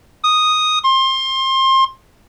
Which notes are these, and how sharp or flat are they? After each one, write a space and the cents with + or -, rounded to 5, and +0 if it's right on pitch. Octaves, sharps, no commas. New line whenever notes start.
D#6 +0
C6 +25